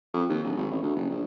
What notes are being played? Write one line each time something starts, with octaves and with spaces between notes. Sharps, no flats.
F2
D#2
D1
G#1
A1
D2
F#1
A#1